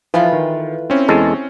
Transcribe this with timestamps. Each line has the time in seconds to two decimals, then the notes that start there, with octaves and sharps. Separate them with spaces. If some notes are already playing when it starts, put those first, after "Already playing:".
0.14 E3 F3 A3 F4 B4
0.33 D#3
0.90 C4 C#4 E4
1.09 E2 F#3 G#3 A4